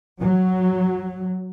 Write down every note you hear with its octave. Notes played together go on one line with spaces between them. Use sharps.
F#3